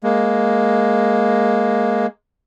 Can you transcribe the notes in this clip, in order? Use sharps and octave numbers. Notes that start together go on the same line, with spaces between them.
G#3 A#3